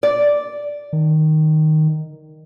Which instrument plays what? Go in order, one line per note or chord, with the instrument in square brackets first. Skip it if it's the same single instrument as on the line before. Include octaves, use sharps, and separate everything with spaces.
[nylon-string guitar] D5
[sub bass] D#3